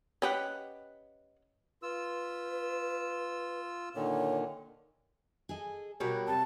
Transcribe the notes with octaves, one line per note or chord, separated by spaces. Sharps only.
C#4 G4 B4 D#5 F#5
F4 B4 E6
A#2 D3 D#3 C#5
G#4 A4 D#5
B2 G3 F#4 A#4 B4 C#5
C3 B3 A5